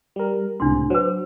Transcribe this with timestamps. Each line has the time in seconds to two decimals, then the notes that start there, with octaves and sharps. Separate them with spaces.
0.16 G3 A#4
0.60 C#2 A2 C3 D4 C6
0.90 F#3 B4 C5